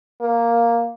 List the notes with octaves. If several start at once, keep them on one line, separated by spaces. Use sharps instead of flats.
A#3